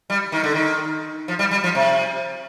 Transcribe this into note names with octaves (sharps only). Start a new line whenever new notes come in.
G3
D#3
D3
D#3
F3
G3
G3
F3
C3